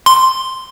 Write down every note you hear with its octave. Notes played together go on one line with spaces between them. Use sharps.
C6